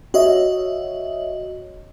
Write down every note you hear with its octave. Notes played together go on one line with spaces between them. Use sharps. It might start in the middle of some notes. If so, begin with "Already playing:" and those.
F#4 C#5 D#5 E5